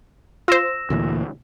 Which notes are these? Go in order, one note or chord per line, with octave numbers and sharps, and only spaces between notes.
F4 C5 E6 A#6 E7
D2 A#2 E3